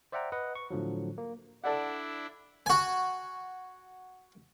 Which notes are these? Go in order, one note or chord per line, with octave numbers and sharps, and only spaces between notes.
C5 D5 E5 F#5 G5 A#5
B4 D#5 F#5
C#6
A2 D3 F3 F#3
A#3
D4 E4 A4 D5 F#5
F#4 G#5